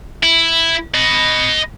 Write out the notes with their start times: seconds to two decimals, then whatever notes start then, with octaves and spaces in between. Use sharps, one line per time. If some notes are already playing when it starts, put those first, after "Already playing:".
0.23 E4
0.94 D#5 B5